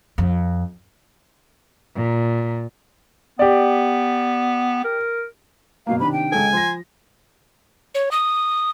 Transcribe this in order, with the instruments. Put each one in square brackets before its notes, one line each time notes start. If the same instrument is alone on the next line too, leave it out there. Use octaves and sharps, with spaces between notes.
[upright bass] F2
[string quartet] A#2
[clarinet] B3 [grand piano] G4 D5
[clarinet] A#4
[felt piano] F#1 B2 A#3 [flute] F5
[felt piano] C3 D#3 D4 [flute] B5
[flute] G5
[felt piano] C#2 G#3 A4 [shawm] G#5
[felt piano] F3 A#6 [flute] C6
[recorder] C#5
D#6